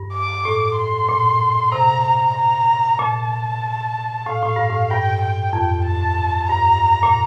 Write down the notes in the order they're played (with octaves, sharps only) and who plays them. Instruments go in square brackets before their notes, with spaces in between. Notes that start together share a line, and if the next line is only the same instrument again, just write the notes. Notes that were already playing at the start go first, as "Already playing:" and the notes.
Already playing: [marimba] G2
[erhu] D6
[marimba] A2
[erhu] C6
[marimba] A#2
[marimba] C3 [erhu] A#5
[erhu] A#5
A#5
[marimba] A#2 [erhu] A5
[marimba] A2 [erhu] F5
[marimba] A2
G2
A2
[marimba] G2 [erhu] G5
[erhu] G5
[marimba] F2
[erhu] A5
[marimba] G2 [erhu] A#5
[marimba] A#2